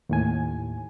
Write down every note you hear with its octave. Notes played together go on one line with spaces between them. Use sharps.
D#2 A2 G#5